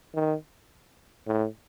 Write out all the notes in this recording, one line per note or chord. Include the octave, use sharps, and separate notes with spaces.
D#3
A2